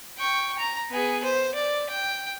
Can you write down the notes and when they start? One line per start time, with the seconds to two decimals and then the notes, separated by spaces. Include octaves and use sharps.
0.18 G5 C#6
0.58 A#5
0.91 B3 G#4
1.24 C5
1.54 D5
1.89 G5